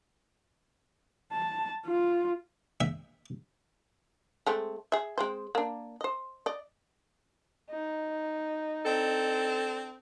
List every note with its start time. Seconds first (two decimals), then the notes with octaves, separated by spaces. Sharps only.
1.32 A5
1.86 F4
2.81 E5
4.46 G#3 A3 C4
4.92 G#4 E5
5.18 G#3 C4 C5
5.55 A#3 D4
6.01 C5 D#5
6.46 D5 D#5
7.70 D#4
8.86 C4 D4 A4